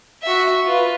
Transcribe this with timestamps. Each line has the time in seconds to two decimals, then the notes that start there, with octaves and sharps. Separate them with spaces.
0.23 F#4 E5
0.65 F4 B4